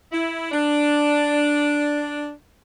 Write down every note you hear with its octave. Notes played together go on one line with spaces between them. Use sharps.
E4
D4